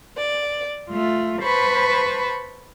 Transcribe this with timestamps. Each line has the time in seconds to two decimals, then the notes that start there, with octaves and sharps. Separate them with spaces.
0.18 D5
0.89 A3 F4
1.43 B4 C5 A5 B5 C#6